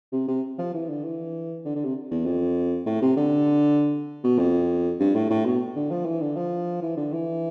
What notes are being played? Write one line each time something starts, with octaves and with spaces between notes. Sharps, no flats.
C3
C3
F3
E3
D3
E3
D3
D3
C3
E2
F2
A2
C3
D3
B2
F2
G2
A2
A2
B2
D3
F3
E3
D3
F3
E3
D3
E3